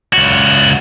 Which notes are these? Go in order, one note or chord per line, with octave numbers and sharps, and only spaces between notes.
C#2 F#4